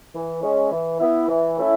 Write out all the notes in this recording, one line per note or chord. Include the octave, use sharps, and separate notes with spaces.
E3
G#3 C#4
E3
B3 E4
E3
A3 C#4 E4